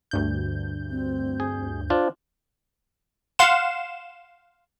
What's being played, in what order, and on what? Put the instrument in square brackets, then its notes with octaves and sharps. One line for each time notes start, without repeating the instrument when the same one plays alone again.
[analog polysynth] D2 G2 G6
[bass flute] C4
[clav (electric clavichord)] G#4
[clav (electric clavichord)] D4 F4 [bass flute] C5
[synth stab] F5 F#5 C6 E7